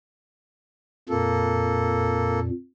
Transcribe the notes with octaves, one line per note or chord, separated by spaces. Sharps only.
F2 A#2 A#3 A4